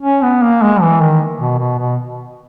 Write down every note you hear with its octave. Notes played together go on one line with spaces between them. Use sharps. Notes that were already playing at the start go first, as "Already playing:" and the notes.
C#4
B3
A#3
G#3
E3
D#3
B2
B2
B2